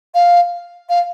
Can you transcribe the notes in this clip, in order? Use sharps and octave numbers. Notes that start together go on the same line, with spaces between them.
F5
F5